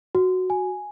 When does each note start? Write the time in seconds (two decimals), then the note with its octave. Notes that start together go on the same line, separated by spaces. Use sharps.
0.15 F#4
0.50 G#5